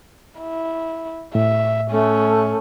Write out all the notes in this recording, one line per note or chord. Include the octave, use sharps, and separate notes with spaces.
E4
A2 E5
A3 C#4